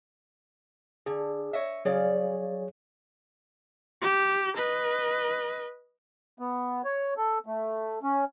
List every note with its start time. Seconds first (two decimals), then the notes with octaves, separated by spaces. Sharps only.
1.06 D3 G#4
1.53 C#5 D#5 E5
1.85 C#3 F#3 G#4 C#5 D5 F5
4.01 G4
4.57 B4 D#5
6.39 B3
6.85 C#5
7.17 A4
7.46 A3
8.03 C#4